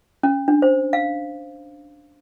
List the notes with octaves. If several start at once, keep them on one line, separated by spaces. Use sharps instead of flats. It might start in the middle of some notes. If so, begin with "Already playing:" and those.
C#4
D4
C5
F5